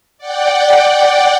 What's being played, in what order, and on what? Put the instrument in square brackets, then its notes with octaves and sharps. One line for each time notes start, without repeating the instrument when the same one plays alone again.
[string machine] D5 F#5 G5